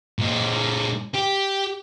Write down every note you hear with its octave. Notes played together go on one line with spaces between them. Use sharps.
A#2 G#3
G4